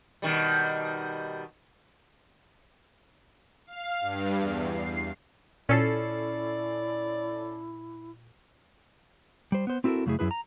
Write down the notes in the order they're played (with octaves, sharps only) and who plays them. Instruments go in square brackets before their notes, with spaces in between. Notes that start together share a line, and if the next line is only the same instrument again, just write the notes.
[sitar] B2 D#3 G3
[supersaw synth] F5
G2
E2
C7
[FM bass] A#2 [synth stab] C#4 A4 C7 [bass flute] E4 [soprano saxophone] D5
[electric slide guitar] G3 C5
B3 C5
C4 E4 F#4 G4 A4 A#4
F#2 C#3 A3 E4 G#4
F#2 C#3 E4 G#4 B4
A#5